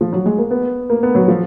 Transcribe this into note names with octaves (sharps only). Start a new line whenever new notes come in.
F3
F#3
G#3
A#3
B3
A#3
B3
F#3
F3